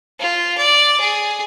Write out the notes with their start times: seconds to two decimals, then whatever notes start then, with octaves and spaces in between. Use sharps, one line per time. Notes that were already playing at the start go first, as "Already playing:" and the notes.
0.20 F4
0.58 D5
1.00 G#4